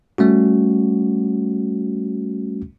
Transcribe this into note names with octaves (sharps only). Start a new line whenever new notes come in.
G3 A3 C#4 F#4